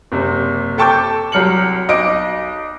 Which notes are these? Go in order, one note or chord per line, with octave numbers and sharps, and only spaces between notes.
F#1 C3
A4 G5 A5 C#6 D6 G6
C2 F#3 F6 C#7 F#7
B1 D#5 D6 D7